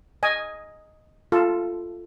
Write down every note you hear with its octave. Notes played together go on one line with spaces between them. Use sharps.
D#5 G#5
F4 A4